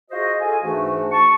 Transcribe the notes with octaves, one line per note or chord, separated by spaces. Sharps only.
F4 F#4 G#4 C5 D#5
F4 G#4 A4 G#5
G#2 E3 A3 D4 F#4
A5 C#6